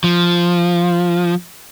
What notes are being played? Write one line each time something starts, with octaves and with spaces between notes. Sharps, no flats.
F3